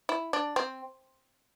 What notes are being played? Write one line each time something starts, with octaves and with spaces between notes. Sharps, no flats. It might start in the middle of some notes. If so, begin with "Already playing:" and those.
E4
D4
C4